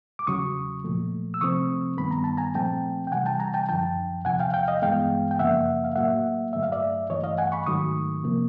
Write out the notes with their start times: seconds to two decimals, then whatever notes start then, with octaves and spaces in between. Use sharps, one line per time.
0.19 D6
0.27 E2 C#3 F#3 C#6 D#6
0.84 A#2 F3 A3
1.34 E6
1.41 C3 F3 A3 C4 C#6 D#6
1.98 G2 D#3 G3 B3 B5
2.11 A#5
2.24 A5
2.37 G#5 A#5
2.54 A#2 F3 A3 C4 G5 A5
3.07 G5
3.11 C3 E3 G3 F#5 G#5
3.26 G5 A5
3.40 G#5 A#5
3.54 G5 A5
3.69 F#2 D3 F3 G5 A5
4.25 E2 C3 F3 F#5 G#5
4.40 F5 G5
4.53 F5 G5
4.68 D#5 F5
4.82 G2 E3 G#3 B3 F5 G5
5.31 G5
5.39 F#2 C#3 F3 A#3 E5 F#5
5.84 F5
5.96 A2 F#3 A#3 E5 F#5
6.53 G2 D3 F#3 A3 E5
6.63 F5
6.72 D5 E5
7.10 G2 E3 A3 C#5 D#5
7.24 D#5 F5
7.38 F#5 G#5
7.52 B5 C#6
7.66 G#2 D#3 F#3 A3 C#6 D#6
8.24 C3 F3 A#3